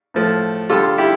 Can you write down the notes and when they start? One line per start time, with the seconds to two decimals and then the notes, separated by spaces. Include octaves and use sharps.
0.14 A2 F3 A3
0.70 D3 G3 F4 A4
0.98 E4 G4